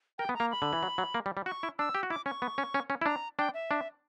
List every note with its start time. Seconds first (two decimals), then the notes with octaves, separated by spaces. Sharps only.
0.18 A#4 G5
0.29 B3
0.35 A#5
0.40 A#3
0.51 B5
0.62 D3
0.73 E3
0.83 F#3
0.98 F#3
1.14 A#3
1.26 G3
1.37 G3
1.46 F#4 C#6
1.63 E4
1.79 D4 E6
1.95 G4
2.03 F#4
2.10 E4 D6
2.26 C#4 C#6
2.42 B3
2.58 C#4
2.74 C#4
2.90 C#4
3.02 E4
3.06 D4 A#5
3.39 D4 G5
3.54 E5
3.71 D4